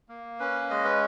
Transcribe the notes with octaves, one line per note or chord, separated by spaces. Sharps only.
A#3
C#4 B4
G#3 D#5
B4